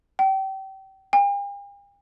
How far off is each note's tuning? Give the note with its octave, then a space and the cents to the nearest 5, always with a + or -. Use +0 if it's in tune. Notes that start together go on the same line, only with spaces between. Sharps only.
G5 -30
G5 +45